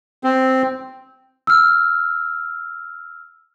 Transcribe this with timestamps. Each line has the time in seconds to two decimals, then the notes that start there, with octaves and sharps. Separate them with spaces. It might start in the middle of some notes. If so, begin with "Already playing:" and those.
0.24 C4
1.47 E6 F6